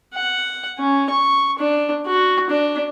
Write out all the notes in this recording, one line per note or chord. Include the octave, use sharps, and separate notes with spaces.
F#5
C#4
C#6
D4
F#4
D4